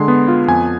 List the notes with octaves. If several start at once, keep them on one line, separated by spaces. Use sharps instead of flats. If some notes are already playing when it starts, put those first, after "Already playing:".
Already playing: D3 G#3 C6
B3
F4
F2 G#5